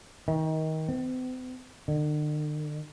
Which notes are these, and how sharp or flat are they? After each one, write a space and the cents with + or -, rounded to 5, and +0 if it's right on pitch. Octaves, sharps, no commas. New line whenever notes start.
D#3 +25
C4 -45
D3 +45